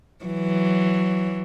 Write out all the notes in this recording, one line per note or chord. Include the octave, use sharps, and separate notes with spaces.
E3 F#3